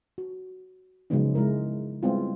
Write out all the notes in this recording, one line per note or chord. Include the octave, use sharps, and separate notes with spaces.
F#4
C#3 F3 F#3 G#3 B3 D#4
C#3 G#3 E4 A#4
G3 G#3 B3 C4 E4 F4